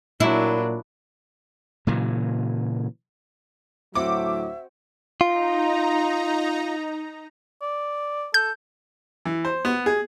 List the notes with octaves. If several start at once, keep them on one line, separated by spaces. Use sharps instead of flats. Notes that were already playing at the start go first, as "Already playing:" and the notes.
A#2 F#3 D4 E4
A#2 C#3 E3 F#3
D2 A2 F#3 C4 F#4 E5 F#5 D6
D#4 F4 A#5
D5
A4 G6
E3
C5
B3
G#4